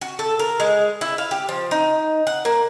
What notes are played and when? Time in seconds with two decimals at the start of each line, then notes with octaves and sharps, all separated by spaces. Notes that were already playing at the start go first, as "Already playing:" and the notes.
0.01 F#4
0.19 A4
0.39 A#4
0.60 G#3
1.01 E4
1.18 F5
1.31 G4
1.49 F3
1.71 D#4
2.27 F#5
2.45 A#3